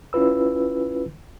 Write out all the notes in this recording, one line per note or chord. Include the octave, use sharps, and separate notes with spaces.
C#4 E4 F4 B4 E6